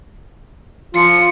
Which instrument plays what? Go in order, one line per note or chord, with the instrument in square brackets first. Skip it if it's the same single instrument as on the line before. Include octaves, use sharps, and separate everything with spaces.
[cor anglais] F3 [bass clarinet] F4 [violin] C#7